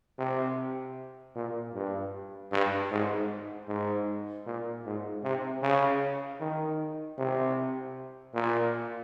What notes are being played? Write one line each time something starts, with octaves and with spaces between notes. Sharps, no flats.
C3
A#2
G2
G2
G#2
G#2
A#2
G#2
C3
C#3
D#3
C3
A#2